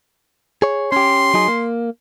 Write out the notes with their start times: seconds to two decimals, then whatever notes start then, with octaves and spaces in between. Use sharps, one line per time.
0.62 G#4 C#5
0.92 C#4 G4 C6
1.34 F#3 D#4 G#4
1.48 A#3